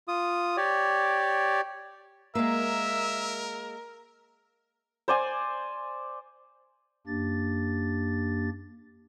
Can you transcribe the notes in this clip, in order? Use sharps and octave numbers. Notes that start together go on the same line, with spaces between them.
F4 D#6
G4 C#5 D5
G#3 A#3 A#4 E5
C5 D5 G#5
F#2 A#3 D4 G4 A6